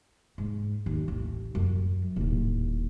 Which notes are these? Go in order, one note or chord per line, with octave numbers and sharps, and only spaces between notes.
G#2
D#2
A1
F#2 F#3
D#1 A2